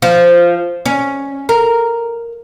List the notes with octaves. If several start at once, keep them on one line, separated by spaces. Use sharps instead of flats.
F3
C#4
A#4